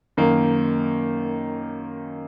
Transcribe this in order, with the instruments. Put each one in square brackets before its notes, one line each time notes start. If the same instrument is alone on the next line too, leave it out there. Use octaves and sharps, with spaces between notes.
[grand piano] F#2 D#3 A#3